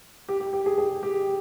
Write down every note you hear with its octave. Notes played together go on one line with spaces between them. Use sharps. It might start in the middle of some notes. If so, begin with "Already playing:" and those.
G4
G4
G4
G#4
G#4
G4